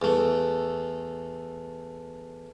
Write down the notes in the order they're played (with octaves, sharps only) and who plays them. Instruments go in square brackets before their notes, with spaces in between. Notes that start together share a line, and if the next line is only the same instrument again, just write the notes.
[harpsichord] E2 A3